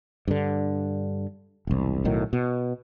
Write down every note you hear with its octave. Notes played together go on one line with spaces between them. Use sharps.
G2 D3
E1 C2
B1 A2 D#3 F#3
B2